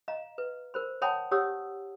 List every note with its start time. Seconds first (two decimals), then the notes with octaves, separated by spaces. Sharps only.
0.08 D#5 F5 A#5
0.38 B4
0.74 A#4 C5 B5
1.02 C#5 F#5 G5 A5 B5 D#6
1.31 G4 C#5 F#5 D#6 E6